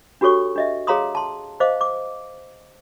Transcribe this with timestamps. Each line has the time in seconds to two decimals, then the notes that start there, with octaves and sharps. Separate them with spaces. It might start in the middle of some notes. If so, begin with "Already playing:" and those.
0.21 D4 F#4 G4 A4 C#5 C#6
0.56 D4 D#5 E5
0.87 G#4 C#5 F5 A#5 C6 D#6
1.15 A5 C6
1.60 C5 D#5 F5 D6
1.81 D6